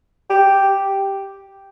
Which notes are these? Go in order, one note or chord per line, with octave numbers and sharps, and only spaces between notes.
G4